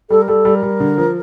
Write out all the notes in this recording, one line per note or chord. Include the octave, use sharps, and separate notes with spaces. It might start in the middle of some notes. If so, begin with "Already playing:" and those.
G3 A4
A#4
G3 A4
G3
A#4
G3
D3
F3